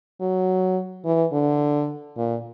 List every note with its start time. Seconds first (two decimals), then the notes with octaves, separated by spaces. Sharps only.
0.21 F#3
1.05 E3
1.32 D3
2.17 A#2